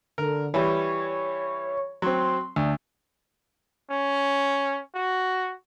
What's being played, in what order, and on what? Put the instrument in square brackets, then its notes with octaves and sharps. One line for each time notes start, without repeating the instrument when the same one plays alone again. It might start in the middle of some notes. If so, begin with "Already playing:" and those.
[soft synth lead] D3 [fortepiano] A#4
[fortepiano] E3 G3 [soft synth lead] C#5
[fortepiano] F#3 C4 [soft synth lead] C6
[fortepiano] D2 [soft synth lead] D4
[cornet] C#4
F#4